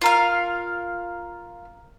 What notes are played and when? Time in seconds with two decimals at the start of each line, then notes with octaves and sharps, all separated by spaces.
0.02 F4 A#4 F5